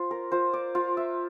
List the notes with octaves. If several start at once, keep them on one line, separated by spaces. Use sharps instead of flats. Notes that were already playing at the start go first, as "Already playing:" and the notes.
Already playing: F4 C5
A#4
F4 C5
D5
F4
E5